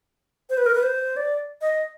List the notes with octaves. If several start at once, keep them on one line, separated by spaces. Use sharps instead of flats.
C5
B4
A#4
B4
C5
D5
D#5